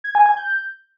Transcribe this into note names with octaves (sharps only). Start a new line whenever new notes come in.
G#6
G#5
G#6
G6